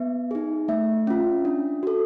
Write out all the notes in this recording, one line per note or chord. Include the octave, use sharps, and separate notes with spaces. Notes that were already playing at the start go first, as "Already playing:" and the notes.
Already playing: B3 E5
D#4 G#4
A3 E5
C#4 F4
D4
F#4 A4